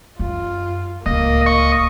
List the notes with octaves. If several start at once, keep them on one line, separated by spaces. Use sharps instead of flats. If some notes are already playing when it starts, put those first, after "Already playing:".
F#2 F4
D1 C#2 A#3 D#5
D#5 C#6